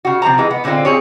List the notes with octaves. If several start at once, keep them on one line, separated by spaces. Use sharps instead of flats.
C#3 F#4
C3 F3 C4 A#5
E3 G#3
B3
A#2 D3 G#3 C4 F4
C4 G#4 C#5